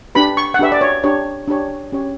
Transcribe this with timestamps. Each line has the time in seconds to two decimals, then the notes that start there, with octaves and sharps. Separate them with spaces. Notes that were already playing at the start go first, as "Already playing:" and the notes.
0.15 D4 G4 B4 B5
0.37 C#6
0.54 F#5
0.59 D4 G4 B4 E5
0.72 D5
0.81 C#5
1.04 D4 G4 C#5
1.48 D4 G4 C#5
1.92 C#4 G4 C#5